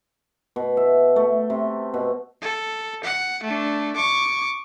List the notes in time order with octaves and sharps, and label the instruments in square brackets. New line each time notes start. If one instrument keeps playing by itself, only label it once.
[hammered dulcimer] B2
E5
A3
C3
B2
[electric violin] A4
F#5
A3 D4
C#6 D6